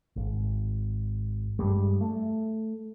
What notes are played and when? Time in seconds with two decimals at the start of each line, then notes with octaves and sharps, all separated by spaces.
0.16 G#1
1.59 G2 G3 G#3 D4
2.01 A3